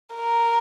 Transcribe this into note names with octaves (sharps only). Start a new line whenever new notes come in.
A#4